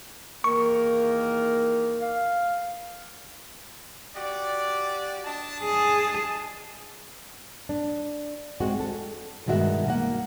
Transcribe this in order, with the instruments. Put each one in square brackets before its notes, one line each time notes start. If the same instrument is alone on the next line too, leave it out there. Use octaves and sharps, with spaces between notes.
[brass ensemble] E2 A#4 [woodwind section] D#3 A#3 [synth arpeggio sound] C#6
[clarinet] F5
[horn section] F#4 G4 D5
D4 D#5 A5
[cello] G#4
[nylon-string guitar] D4
G#3 C4 F#4
A4
G2 B2 D#3 G#3 F#4 E5
A#3 F#5